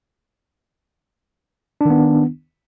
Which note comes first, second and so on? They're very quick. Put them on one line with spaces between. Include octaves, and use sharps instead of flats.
D4 D#3 B3